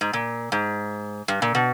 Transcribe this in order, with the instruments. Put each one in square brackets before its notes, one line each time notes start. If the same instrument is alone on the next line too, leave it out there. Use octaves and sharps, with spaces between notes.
[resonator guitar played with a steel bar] G#2
A#2
G#2
G2
A#2
B2